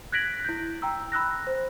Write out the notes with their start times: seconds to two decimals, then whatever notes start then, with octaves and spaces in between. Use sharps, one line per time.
0.12 F#6 G#6 A#6 B6 D7 F#7
0.45 E4 G6
0.82 G5 A#5 E6
1.12 B5 E6 F#6 A#6
1.47 C5